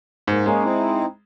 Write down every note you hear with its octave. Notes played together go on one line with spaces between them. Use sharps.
G#2 A#3
G#3 A#3 C#4 D#4
C4 D#4 E4